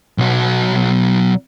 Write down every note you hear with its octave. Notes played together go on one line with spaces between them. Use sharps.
B1 F#3